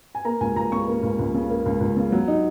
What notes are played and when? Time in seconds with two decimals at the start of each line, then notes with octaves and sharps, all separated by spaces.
0.15 G#5
0.25 A#3 A#5
0.41 C#2 G#5
0.56 C#2 A#5
0.72 C#3 C#6
0.87 A#3
1.03 C#2
1.19 C#2
1.34 C#3
1.50 A#3
1.66 C#2
1.81 C#2
1.97 C#3
2.12 F#3
2.28 D#4